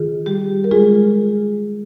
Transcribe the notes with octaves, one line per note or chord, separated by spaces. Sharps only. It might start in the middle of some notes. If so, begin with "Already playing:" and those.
Already playing: D#3 F4 G#4
G3 G4
A#4
G#3 F4 G#4